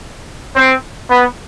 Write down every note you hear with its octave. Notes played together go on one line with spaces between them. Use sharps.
C4
B3